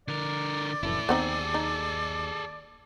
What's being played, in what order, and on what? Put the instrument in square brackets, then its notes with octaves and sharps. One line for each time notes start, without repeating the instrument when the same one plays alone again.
[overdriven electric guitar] D3 A#4 [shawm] D5
[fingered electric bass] F1 F#2 E3 [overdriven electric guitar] E4 A4
[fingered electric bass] D#2 [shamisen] B3 C4 D#4 [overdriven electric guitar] G#4 A4
[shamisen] D#4